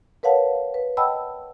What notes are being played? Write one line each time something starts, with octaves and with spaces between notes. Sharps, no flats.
A#4 B4 C#5 F5 F#5 A5
B4
D#5 F#5 G5 A5 B5 E6